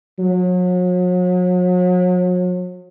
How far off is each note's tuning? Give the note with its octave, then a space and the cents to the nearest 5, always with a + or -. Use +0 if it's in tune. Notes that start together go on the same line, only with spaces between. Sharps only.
F#3 -40